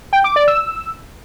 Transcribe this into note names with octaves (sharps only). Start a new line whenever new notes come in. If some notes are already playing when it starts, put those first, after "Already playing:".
G5
D6
D5
E6